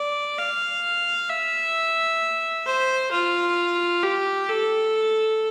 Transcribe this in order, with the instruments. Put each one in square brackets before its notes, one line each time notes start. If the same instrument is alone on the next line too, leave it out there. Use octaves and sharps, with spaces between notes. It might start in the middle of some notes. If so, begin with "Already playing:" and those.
Already playing: [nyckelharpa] D5
F5
E5
C5
F4
G4
A4